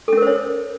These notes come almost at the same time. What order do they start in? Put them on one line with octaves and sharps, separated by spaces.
A4 C#4 A#4 C5 C#5